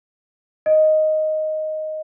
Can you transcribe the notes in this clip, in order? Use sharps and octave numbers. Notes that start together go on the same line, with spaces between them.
D#5